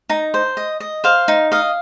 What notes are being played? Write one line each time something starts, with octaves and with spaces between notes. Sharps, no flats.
D#4 A#5
C5
D#5
D#5
C5 F5
D#4
D#5 F5